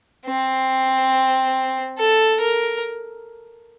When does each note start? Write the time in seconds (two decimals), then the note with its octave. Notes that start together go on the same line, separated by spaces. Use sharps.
0.26 C4
1.98 A4
2.40 A#4